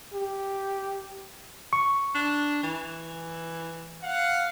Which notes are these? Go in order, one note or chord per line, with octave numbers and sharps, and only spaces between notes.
G4
C#6
D4
E3
F5 F#5